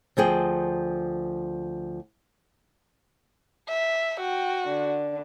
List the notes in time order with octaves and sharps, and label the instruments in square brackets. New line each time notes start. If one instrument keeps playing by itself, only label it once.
[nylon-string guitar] D2 F3 G#4 G5
[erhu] E5
[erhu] F#4 [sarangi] G5
[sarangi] D3